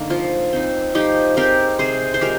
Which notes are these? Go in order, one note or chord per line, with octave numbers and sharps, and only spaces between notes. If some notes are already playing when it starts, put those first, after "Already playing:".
Already playing: D3 A#3 D#4
F3 F4
C4 D#4
F3 D#4 G4
G#3 C4 D#4 G4 A#4
C3 G#4 C5
C5
F3 G#3 G4 A#4